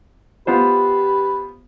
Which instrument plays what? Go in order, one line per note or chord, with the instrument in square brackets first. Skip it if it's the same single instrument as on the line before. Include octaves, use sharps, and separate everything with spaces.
[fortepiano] B3 F4 C5 [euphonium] G4 [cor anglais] B4